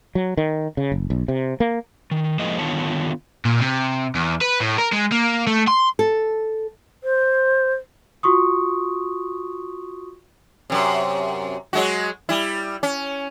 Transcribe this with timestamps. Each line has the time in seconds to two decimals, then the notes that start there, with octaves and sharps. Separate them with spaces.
0.15 F#3
0.37 D#3
0.77 C#3
0.92 F#1
1.10 B1
1.28 C3
1.60 A#3
2.11 D#3
2.39 A2 F3 G#3 A#3 C5 D#5
2.59 D3 D#3 B3 F4 C#5 A5
3.45 A#2
3.60 C3
4.15 E2
4.41 B4
4.61 A2
4.78 A#4
4.93 G#3
5.12 A#3
5.47 A3
5.67 C6
5.99 A4
7.04 C5
8.23 F4 F#4 C6 C#6 D#6
10.70 F#2 C3
11.73 F#3 G#3 F#4
12.29 G3 E4
12.83 C#4